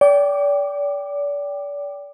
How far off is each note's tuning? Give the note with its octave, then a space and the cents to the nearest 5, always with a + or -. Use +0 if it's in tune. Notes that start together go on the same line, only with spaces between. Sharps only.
D5 -35 G5 +0 D6 +15